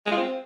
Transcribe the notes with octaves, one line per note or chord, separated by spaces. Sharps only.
G#3
F4
C4